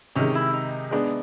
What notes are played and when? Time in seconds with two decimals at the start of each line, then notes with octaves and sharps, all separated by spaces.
0.15 C3 D#3 G#3 C#4
0.35 E4
0.53 D#4
0.91 G#3 B3 D4